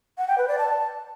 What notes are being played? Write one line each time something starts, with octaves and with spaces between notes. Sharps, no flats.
F#5
G5
B4
D5
A5